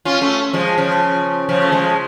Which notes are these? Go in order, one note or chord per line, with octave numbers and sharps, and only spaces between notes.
C#4 F4
A3 C#4
F3 G#3
C#3 F3
C#3 F3
A3
F3 G#3